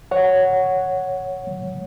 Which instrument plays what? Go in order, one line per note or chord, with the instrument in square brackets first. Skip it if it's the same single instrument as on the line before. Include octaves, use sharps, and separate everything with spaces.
[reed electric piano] C#5 F#5